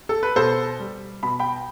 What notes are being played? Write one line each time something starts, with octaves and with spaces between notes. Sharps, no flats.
A4
B4
B2 A4 C5
G3
B2 B5
G5 B5